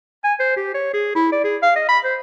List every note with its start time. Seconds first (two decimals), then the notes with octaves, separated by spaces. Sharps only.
0.24 G#5
0.40 C5
0.57 G4
0.74 C#5
0.94 G#4
1.15 E4
1.32 D5
1.44 G#4
1.62 F5
1.76 D#5
1.89 B5
2.04 C5